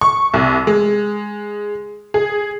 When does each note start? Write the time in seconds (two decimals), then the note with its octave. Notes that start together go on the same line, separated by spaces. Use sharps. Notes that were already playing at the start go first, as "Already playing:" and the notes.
0.01 C#6
0.34 C2
0.67 G#3
2.14 G#4